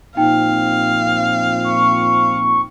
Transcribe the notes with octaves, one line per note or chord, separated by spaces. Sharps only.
A#2 F3 C4 D#4 F5 G5
C#6